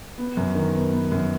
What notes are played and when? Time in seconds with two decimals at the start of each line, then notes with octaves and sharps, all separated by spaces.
0.18 B3
0.37 F#2
0.55 D#3
0.74 B3
0.93 B3
1.12 F#2